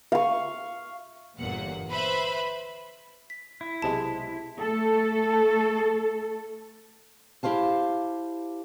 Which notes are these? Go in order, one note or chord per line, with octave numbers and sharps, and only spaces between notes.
F5 C#6
G1 E2 A#2 F#5
B4 C5 E5 B5
B6
E4
B1 C3 G#3 A5
A3 A4
E4 G4 C5 F5 A5